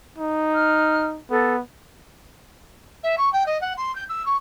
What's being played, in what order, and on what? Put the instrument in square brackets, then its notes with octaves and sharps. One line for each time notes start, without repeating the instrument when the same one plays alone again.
[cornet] D#4
[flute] F6
[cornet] B3 [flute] A4
[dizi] E5
C#6
G5
D#5
F#5
C6
G6
E6
C#6